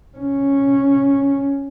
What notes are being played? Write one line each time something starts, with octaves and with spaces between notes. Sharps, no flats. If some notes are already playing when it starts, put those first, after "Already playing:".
C#4